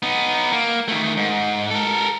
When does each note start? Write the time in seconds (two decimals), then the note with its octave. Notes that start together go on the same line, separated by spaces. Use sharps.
0.03 B3 D#4
0.53 A#3
0.88 D#3 A3
1.17 G#2
1.71 A4 A#4